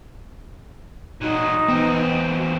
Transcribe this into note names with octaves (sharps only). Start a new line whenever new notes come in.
A#2 F#3 D#4
E2 B3 C4
F#4